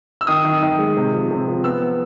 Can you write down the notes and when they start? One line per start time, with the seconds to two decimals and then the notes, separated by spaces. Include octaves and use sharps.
0.21 E6
0.27 D#3 D#6
0.44 D#3
0.63 D#3
0.78 G#3
0.97 C3
1.13 F3
1.31 C3
1.48 F3
1.64 B3 E6
1.82 B3